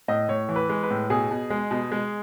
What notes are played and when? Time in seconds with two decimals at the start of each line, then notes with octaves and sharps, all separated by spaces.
0.08 A2 D#5
0.29 A2 C#5
0.49 E3
0.56 B4
0.69 G#3
0.83 B4
0.90 A2
1.10 B2 G#4
1.31 B2
1.50 G#3
1.71 B2
1.92 G#3